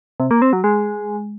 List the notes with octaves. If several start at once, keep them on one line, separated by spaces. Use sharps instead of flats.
C3
A#3
C4
F#3
G#3